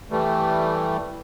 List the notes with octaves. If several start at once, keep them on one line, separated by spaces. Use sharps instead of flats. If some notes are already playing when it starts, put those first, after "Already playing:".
E3 G3 A3